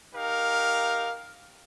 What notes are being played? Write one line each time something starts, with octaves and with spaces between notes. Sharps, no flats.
D#4 G4 A#4 F5